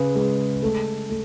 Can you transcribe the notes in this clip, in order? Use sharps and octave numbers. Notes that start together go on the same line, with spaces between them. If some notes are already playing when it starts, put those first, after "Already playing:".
Already playing: C#3 G#4 B4
G#3
A3
A3